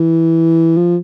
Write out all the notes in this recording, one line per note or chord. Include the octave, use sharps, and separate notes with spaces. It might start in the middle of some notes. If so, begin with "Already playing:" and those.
Already playing: E3
F3